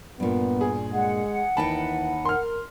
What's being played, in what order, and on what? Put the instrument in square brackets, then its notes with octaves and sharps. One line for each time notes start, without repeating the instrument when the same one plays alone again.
[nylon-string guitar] G2 A#2 [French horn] B3
[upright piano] G#4
[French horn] G#3 [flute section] F#5
[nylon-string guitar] D#2 D#4 G5 [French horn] E3 [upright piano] A5 B5
[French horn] A#4 [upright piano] C6 F6